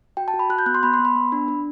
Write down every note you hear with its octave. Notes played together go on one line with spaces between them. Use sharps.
F#4 G5
A5
F#4
B5
F#4 F#6
G6
B3 F#6
C6
B3 B5
C6
B3
B5
B3
D4
D4